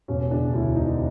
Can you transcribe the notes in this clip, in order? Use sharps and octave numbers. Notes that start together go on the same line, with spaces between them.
E1 C#4
C#3 D4
D2 E4
E1 D#4